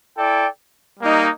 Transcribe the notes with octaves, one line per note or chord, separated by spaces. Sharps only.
E4 A4 D5 G5
G3 A#3 D#4